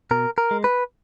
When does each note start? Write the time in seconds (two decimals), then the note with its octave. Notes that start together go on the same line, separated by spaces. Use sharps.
0.11 B2 A#4
0.38 A#4
0.51 G#3
0.64 B4